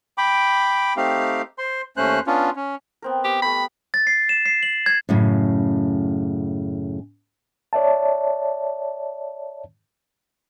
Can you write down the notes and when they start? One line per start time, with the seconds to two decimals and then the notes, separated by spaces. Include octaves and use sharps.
0.18 G5 B5 D6
0.97 A3 C4 D#4 G4 F5
1.58 C5 C6
1.97 D#2 A3 C#4 C5 F#6
2.27 B3 C#4 D4 F4
2.56 C#4
3.02 B3 C4 A#4
3.24 B3 G4
3.42 G3 A3 G5 B5
3.94 A6
4.07 C7
4.29 E7
4.46 C7
4.63 F#7
4.86 G#6
5.09 F#2 A2 C#3
7.73 C#5 D5 E5 A5